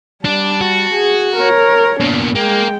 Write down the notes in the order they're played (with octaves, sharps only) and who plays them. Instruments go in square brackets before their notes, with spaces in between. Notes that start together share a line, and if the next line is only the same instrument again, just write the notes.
[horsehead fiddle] G3 A5 [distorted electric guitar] D4
[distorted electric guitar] F#4
[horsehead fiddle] G#4
A#4 C#5
[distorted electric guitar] B2 A#3 [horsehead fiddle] D4
[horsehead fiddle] G#3 G5 [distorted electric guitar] A#3